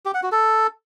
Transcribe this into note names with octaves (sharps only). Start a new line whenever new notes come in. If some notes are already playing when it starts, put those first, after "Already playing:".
G4
F#5
F#4
A4